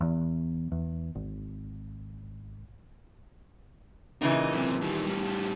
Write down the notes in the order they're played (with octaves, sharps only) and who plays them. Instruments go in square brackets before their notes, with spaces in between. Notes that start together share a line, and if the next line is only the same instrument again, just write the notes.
[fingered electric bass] E2
E2
G#1
[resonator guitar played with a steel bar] A#2 C#3 E3 [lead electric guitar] D#4 D#5
[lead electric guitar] F#2 C3
D#3 G3
A2 G3